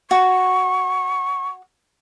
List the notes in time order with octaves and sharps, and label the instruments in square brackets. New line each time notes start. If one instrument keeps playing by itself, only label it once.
[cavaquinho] F#4 [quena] C#6